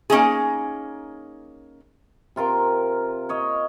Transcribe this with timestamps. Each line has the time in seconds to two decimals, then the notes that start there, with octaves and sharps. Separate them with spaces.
0.10 A#3 C#4 D#4 G#4
2.36 C3 F4 A#4 C6
3.29 C#5 D#5